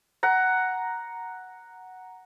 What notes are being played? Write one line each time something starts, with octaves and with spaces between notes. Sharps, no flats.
F#5 A#5